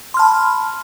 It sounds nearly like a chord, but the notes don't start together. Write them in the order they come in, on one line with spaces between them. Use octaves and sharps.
C6 F6 A5 B5